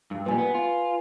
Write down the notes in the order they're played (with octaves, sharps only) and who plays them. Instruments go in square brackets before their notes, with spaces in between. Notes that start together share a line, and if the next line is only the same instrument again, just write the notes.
[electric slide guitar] G2
[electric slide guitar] A#2 G3 [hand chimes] B4 G#5
[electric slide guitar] B3
F4